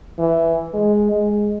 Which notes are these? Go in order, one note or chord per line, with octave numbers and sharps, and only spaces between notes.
E3
G#3
G#3